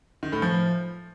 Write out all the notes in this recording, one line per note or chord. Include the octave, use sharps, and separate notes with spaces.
D#3
A2
F3